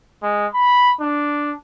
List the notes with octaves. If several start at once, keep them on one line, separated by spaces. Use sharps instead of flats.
G#3
B5
D4